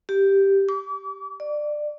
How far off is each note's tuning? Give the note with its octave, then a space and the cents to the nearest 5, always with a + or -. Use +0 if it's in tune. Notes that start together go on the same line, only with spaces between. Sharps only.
G4 +0
D6 -40
D5 +20